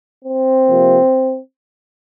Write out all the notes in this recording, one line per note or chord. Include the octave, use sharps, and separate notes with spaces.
C4
C3 F3 A#3